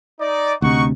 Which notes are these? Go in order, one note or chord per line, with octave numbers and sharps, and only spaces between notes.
D#4 D5
D2 C3 D#4 F#5 C#6